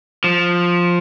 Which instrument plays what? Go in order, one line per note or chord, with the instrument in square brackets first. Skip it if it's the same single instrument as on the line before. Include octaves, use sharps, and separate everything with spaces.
[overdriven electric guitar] F3